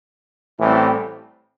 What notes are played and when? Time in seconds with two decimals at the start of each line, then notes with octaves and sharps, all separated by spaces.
0.59 A1 A2 E3 G3 C4